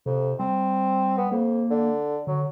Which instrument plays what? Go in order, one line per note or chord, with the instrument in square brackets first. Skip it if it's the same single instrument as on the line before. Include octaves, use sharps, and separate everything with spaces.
[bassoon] F2 [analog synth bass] C3
[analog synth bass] G3 [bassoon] C4
[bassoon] B3
[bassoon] F2 [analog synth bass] A#3
[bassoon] D3
[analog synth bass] D3 [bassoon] F#3